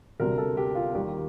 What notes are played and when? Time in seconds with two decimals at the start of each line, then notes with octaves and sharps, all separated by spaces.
0.20 D2 C3 G3 A#4
0.38 A4
0.57 G4
0.75 F4
0.94 D#2 D#3 G3 G4